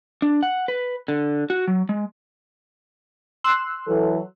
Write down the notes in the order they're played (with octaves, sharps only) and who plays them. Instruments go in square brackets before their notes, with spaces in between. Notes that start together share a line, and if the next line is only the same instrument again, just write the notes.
[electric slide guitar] D4
F#5
B4
D3
F#4
F#3
G#3
[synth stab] C6 E6 F#6
[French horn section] E3 F#3 A4